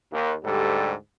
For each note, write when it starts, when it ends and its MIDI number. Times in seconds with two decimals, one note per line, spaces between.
0.12 0.33 39
0.45 0.93 38
0.45 0.93 44
0.45 0.93 55
0.45 0.93 67
0.45 0.93 69